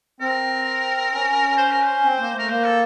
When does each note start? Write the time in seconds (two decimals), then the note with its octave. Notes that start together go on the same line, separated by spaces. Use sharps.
0.21 C4 A#4
1.12 C#4
1.57 C5
1.71 A#4
1.84 C5
2.03 C4
2.19 A#3
2.33 A3
2.38 A#4
2.49 A#3 C5
2.64 A4